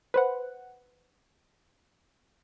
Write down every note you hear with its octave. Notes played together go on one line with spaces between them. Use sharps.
B4 C5 F#5